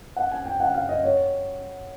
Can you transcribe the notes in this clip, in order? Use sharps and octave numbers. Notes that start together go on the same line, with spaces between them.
F#5
G#5
G5
F#5
F5
D#5
C#5